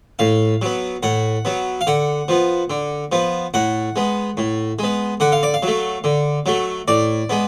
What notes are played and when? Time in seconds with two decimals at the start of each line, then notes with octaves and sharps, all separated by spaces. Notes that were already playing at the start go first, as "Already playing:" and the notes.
0.19 A2 F5
0.62 F#3 B3
1.03 A2 F#5
1.45 F#3 B3
1.81 F5
1.87 D3 F#5
2.28 F3 B3
2.70 D3
3.12 F3 B3
3.54 A2 F#5
3.96 G#3 B3
4.37 A2
4.79 G#3 B3
5.20 D3 F#5
5.32 F5
5.43 D5
5.54 F5
5.63 F#3 A3
6.04 D3
6.46 F#3 A3
6.88 A2 D5
7.30 G#3 B3